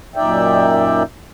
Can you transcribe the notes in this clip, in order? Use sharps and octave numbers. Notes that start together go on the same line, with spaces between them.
F#2 A#2 D#4 D5 E5 G5